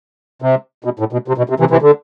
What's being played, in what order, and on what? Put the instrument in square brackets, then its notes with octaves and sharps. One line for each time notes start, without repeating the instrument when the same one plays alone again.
[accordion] C3
B2
A2
B2
C3
B2
C3
C3 E3
C3 E3
D3